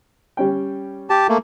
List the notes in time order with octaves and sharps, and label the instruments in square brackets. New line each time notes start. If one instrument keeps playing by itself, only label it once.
[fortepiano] G3 C#4 G5
[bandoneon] G4 A5
A3 A#3